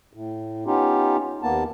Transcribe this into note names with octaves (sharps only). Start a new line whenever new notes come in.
A2
B3 C#4 D#4 F4 G4
D#2 A#3 B3 A5